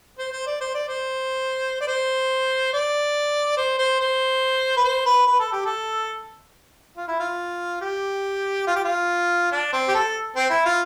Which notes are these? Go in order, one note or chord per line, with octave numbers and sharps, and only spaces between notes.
C5
C5
D5
C5
D5
C5
D5
C5
D5
C5
C5
C5
B4
C5
B4
B4
A4
G4
A4
F4
E4
F4
G4
F4
G4
F4
D4
C4
G4
A4
C4
E4
F4